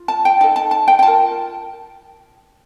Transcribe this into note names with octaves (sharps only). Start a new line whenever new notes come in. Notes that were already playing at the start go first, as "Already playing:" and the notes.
Already playing: F4
A5
G5
D#4 A4 A5
A5
A5
G5
G5
F4 A#4 A5